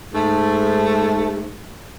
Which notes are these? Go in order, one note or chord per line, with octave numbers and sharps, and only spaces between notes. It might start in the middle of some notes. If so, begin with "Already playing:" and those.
G#2 A3